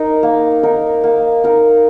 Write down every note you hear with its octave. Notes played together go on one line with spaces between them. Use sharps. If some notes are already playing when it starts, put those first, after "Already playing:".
Already playing: D#4 A#4
A#3
D#4 A#4
A#3
D#4 A#4